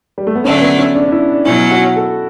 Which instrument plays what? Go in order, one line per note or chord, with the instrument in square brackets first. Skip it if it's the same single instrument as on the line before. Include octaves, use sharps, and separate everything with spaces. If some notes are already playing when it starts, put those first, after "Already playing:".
[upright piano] G3
A3
B3
[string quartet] D3 F#3 A3 D4 [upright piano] C#4
[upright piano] C#4
B3
C#4
D4
D4
E4
D4
[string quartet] B2 F#3 C#4 [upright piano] E4
[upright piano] F#4
A4